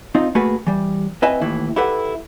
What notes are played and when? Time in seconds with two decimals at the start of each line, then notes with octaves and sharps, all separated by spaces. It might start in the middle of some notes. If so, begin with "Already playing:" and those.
0.15 C4 D#4 F4
0.35 A3 A#3 F#4 G#4 B4
0.67 E3 G3
1.22 C4 E4 B4 D#5 E5 G#5
1.41 D#2 A2 E3 E4
1.76 E4 G4 A4 B4 F#5